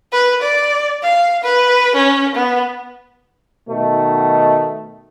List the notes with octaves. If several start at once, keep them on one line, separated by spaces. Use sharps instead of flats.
B4
D5
F5
B4
C#4
B3
B2 D#3 A3